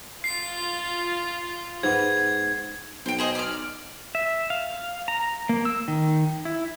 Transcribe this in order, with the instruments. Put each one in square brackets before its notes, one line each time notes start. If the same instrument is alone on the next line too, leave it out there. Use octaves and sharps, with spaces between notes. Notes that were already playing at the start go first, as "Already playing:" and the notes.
[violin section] F4 [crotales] C7
[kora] G#2 B3 [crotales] G#6
[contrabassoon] B1 [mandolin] C5 G5
[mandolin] G#4 C5 D#5
D5 F6
[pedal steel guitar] E5
F5
A#5
A#3
E6
D#3
E4